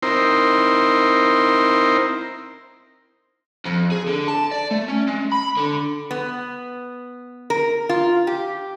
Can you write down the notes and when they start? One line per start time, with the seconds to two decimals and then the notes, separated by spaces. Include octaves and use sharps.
0.02 C4 D#4 E4 A#4 C5
3.65 F2
3.91 G#4
4.07 D3
4.28 A5
4.51 D5
4.71 A3
4.88 C#4
5.07 G#3
5.32 B5
5.57 D3
6.11 B3
7.50 A#4
7.89 F4
8.27 G4